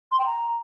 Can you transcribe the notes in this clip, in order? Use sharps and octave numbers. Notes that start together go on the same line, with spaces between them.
C6
G5
A#5